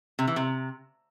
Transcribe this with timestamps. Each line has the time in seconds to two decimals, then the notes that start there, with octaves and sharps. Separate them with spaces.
0.19 C3
0.27 E3
0.36 C3